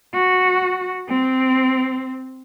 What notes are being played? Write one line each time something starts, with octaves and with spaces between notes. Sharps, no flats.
F#4
C4